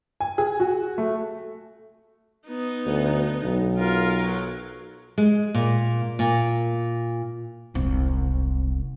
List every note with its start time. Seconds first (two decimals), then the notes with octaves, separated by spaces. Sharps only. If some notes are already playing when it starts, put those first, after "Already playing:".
0.20 G#5
0.38 G#4
0.60 F#4
0.98 A3
2.48 B3 D#4
2.86 D2
3.43 B1
3.78 F4 A#4
4.24 F#3
5.18 G#3
5.54 A#2
6.19 A#2
7.74 E1 C2